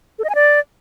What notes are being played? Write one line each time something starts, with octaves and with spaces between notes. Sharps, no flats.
A4
D#5
G#5
D5